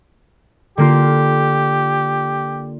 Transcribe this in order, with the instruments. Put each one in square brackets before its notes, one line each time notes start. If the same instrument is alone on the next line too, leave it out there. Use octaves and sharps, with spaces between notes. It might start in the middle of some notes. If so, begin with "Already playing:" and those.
[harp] D3 A#3 F4 [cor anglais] G4